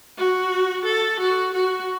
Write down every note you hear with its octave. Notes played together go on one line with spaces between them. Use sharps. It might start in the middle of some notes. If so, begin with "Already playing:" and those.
F#4
A4
F#4
F#4